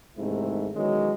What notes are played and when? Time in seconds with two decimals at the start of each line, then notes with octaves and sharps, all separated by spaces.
0.17 E2 G#2 C3 D#3 A3 E4
0.75 B2 D#3 E3 F#3 G#3 C#4